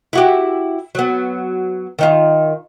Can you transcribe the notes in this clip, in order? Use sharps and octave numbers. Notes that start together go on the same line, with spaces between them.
E4 F#4 G4
F#3 B3
D#3 D#4 F4